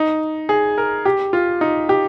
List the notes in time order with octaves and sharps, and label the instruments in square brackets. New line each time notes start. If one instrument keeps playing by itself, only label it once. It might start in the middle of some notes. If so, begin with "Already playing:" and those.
Already playing: [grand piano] D#4
G#4
A#4
G4
F4
D#4
G4